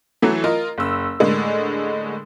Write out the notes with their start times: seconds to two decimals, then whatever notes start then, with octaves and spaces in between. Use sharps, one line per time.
0.22 E3 F#3 A3
0.44 F4 A#4 D#5
0.78 F#1 E6
1.20 A2 D3 G#3 A#3